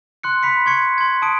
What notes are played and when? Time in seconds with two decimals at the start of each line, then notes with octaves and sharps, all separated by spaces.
0.23 C6 F#6 C#7
0.43 B5 B6 C#7
0.66 C6 C#6 G#6 C#7
0.98 C6 G#6
1.22 A5 D#6 D7